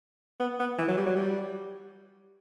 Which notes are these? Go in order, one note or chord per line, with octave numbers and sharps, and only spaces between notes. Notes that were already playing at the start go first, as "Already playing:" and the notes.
B3
B3
E3
F#3
G3
F#3
G3